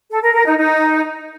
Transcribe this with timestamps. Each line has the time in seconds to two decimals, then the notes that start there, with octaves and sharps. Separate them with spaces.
0.11 A4
0.22 A#4
0.34 A#4
0.45 D#4
0.57 D#4